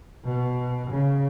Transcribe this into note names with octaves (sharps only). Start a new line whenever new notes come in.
B2
C#3